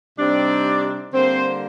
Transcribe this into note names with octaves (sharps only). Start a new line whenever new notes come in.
C3 G3 C4 D4 D#4 D5
D3 G3 A#3 C4 C5